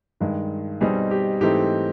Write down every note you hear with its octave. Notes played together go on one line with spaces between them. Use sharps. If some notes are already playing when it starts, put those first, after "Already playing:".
G2 D#3 G#3
B2 G3 C4 D#4 G#4
G4
G#2 E3 A3 C4 D#4 G4